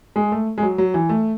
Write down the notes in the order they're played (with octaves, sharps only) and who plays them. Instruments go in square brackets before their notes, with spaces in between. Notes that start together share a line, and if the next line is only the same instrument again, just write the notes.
[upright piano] G#3
A3
G#3
F#3
F#3
E3
A3